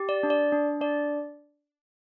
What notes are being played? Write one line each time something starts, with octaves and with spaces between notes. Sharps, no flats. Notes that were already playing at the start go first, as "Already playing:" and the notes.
Already playing: G4
D5
D4
D5
D4
D4 D5